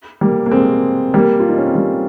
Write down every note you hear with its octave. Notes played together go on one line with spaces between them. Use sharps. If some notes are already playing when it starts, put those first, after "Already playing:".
G3 A#3
A#3
G#3 C4
G3 A#3
F4
D#4
C#4
C4
G3 A#3